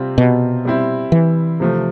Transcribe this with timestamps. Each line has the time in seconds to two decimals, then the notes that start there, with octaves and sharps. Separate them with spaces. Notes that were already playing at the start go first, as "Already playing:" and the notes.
Already playing: C3 G3 C4 F4
0.18 B2
0.65 G3 C4 E4
1.12 E3
1.60 C3 F3 A3